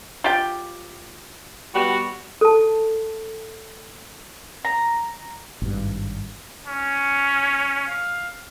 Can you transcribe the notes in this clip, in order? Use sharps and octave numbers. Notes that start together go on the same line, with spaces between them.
F4 G4 G5
G3 B3 F#4
A4 A5
A#5
G#1 G2
C#4
F5